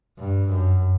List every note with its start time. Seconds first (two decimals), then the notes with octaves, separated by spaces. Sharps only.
0.18 G2
0.49 F#2